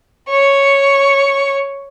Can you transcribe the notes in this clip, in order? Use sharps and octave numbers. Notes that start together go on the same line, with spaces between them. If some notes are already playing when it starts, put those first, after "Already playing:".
C#5 C#6